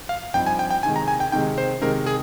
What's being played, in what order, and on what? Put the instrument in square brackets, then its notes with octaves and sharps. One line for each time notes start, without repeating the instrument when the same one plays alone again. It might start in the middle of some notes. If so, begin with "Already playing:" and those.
[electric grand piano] F5
[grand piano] G2 F3 C4 D#4 [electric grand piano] G5
[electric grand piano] G#5
G5
G5
[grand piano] C3 D#3 G#3 [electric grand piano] G#5
[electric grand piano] A#5
G#5
G5
[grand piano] C3 D#3 G#3 [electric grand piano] G5
[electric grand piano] C5
[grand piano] C3 D#3 G#3 [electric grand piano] A#4
[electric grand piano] G#4